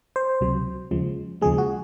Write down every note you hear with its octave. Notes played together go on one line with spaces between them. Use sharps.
C5
C#2 C3 F#3
D#2 C#3 F3 G#3
D#2 C#3 F3 G#3 G#4
F#4